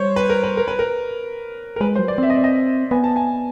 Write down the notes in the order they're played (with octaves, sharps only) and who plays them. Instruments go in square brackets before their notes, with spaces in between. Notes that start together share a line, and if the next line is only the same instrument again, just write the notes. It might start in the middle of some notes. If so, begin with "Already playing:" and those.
Already playing: [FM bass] G3 [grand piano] C5 C#5
[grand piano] B4
A#4
B4
A#4
B4
A#4
A#4
[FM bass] G#3 [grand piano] B4
[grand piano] C5
[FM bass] F#3
[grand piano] D5
[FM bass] C4 [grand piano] E5
[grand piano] D#5
D5
D#5
[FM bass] B3 [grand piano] G#5
[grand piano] A5
G#5